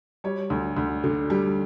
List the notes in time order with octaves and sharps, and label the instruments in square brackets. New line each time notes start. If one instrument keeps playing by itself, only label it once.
[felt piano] G3 C#5
D2
D2
D3
G3